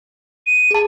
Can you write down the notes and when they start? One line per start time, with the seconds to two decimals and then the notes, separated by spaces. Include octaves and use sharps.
0.47 D#7
0.71 G#4 A5